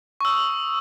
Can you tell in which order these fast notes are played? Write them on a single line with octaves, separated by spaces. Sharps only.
C#6 E6 D#6